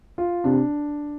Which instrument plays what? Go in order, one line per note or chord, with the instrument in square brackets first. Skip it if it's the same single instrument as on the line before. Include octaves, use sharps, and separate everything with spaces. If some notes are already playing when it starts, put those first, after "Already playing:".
[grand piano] F4
[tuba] C3 [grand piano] D4